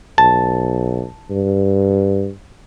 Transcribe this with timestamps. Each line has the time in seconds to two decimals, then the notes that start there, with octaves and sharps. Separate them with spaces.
0.18 B1 A5
1.30 G2